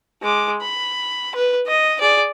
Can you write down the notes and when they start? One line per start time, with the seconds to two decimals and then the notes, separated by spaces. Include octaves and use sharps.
0.22 G#3 D6
0.61 B5
1.35 B4
1.67 D#5
2.01 G#4 D5